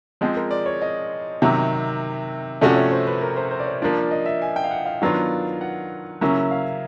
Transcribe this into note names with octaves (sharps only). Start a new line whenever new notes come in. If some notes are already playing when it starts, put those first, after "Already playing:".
F3 G#3 C4 G#4
A#4
D5
C#5
D#5
C3 D#3 F#3 E5
C3 F3 A3 C#4 F#4 D5
C#5
C5
B4
A#4
C5
C5
D5
C#5
F3 A#3 D4 F4 D5
D5
D#5
E5
G#5
G5
F5
F#5
F5
D#3 F#3 B3 D4 F4 F5
F#5
C#3 F#3 A#3 C#4 E4 E5
F5